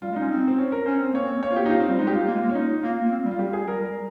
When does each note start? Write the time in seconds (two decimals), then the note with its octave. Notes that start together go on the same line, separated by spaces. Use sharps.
0.02 G3 F4
0.11 G#3
0.16 D#4
0.21 C#4
0.30 C4
0.47 C4
0.58 C#4
0.72 A#4
0.86 C#4 C5
0.99 C4
1.13 A#3 C#5
1.25 C4
1.43 A#3 C#5
1.51 F4
1.56 G4
1.66 D#4
1.70 F4
1.80 C4
1.89 G3
1.99 G#3 D#4
2.07 G4
2.12 F4
2.27 A#3
2.34 G#3
2.41 A#3
2.49 C#4
2.55 D#4
2.83 A#3 F4
3.05 A#3
3.12 C4
3.25 G3
3.31 F4
3.39 G3 G4
3.53 G#4
3.68 G3 A#4
3.81 G3